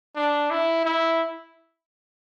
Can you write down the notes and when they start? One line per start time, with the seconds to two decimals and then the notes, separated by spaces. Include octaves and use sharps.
0.16 D4
0.51 E4
0.85 E4